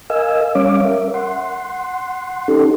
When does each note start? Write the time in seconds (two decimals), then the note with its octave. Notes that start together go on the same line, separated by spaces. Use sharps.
0.10 A#4 D#5 F5 G#5 E6
0.55 G3 C#4 C#5 F5 D6
0.85 A#4 E5
1.14 F#5 C6
2.48 C#4 D#4 G4 A4